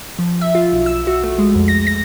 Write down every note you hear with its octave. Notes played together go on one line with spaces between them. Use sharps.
F3
E5
F4
B1
E6
F#4
A3
G#3
F2
A#6
A#6